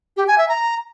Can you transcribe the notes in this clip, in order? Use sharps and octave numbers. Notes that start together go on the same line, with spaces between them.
G4
G#5
E5
A#5